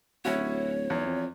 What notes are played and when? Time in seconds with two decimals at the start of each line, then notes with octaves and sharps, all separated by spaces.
0.25 D1 C#4 E4 F#4 C#5
0.90 B1 E2
1.06 F2